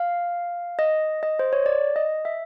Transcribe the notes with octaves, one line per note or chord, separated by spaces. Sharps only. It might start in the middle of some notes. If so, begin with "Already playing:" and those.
Already playing: F5
D#5
D#5
C5
C#5
D5
D#5
E5